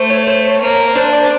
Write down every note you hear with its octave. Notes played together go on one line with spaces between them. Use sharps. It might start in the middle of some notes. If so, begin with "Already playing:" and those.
Already playing: A3 C5
C#5
C5
A#3
D4 C5
D5